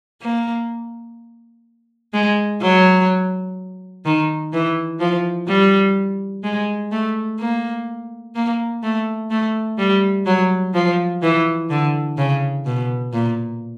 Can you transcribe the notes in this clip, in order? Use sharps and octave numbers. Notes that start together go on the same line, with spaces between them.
A#3
G#3
F#3
D#3
E3
F3
G3
G#3
A3
A#3
A#3
A3
A3
G3
F#3
F3
E3
D3
C#3
B2
A#2